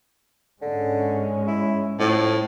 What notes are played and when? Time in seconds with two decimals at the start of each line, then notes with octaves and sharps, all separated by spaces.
0.62 G#2 D3 G#3 C#4
1.48 E4
1.99 F2 A2